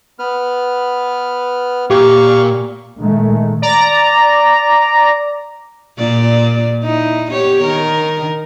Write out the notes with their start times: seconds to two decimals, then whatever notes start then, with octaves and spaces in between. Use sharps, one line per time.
0.19 B3 B4 F6
1.90 A#2 G4 F5 C#6
2.98 A#2 D#3 G#3 A3
3.62 D5 A#5
5.98 A#2 D5
6.84 D#4 E4
7.31 B3 G4 C#5
7.63 D#3 A#4